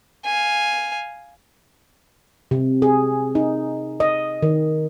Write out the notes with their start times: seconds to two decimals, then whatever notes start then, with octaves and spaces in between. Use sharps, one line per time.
0.25 F5 G#5
2.51 C3
2.82 G#4
3.35 D#4
4.00 D#5
4.42 D#3